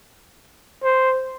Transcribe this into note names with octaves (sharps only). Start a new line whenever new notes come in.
C5